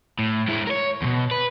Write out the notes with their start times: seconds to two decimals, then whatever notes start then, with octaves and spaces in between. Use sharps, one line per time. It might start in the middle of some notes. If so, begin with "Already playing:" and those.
0.19 A2
0.48 G#3 E4
0.67 A#4 C#5
1.02 E2 B2
1.31 B4